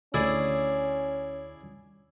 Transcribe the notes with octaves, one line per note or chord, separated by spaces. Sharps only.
D2 C#4 E4 G#4 D5